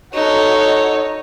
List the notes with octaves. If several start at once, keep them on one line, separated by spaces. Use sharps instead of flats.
D#4 F#4 A4 C#5 D#5